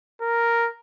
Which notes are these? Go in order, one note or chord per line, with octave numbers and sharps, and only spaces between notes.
A#4